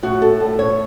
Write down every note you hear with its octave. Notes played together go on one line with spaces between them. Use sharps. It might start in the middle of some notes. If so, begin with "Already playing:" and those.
A2 F#4
A4
A2
C#5